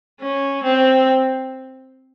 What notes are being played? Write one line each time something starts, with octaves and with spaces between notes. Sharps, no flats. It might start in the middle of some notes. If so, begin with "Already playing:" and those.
C#4
C4